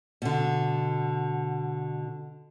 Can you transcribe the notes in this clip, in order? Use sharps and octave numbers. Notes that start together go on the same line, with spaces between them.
B2 D3